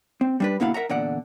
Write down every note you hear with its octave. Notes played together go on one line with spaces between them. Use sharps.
C4
G3 D4 B4
B2 D3 A#3 E4 F5 F#5
A#4 E5 F#5 A#5
E2 A#2 D3 D5 F#5